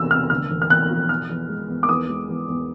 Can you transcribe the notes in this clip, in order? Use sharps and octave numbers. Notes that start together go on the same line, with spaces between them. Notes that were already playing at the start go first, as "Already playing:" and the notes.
Already playing: E1 C3 E6
C3 F6
D2 F6
E1
F6
E1 F#6
F3
B2 F6
E2
G#3
E2
D6
E2 D#6
G#3
E2
E2